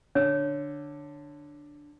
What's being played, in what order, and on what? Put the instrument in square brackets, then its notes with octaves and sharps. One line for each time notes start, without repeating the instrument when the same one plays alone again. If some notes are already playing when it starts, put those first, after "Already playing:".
[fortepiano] D3 [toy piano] C#5